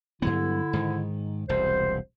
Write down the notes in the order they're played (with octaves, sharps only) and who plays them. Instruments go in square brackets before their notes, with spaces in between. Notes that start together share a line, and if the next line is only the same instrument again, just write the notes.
[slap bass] G2 F#3 B3 [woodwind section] D3 E4
[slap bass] G#2 D#3
[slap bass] E1 C2 [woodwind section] C5